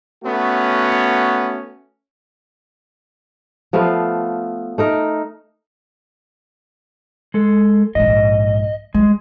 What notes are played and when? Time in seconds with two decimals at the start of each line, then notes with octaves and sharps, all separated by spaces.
0.24 A3 B3 C#4 F#4
3.73 F3 A3 B3 F5
4.78 A3 D#4 A#4
7.34 G#3 A4
7.95 A#1 G#2 D#5
8.94 G3 G#3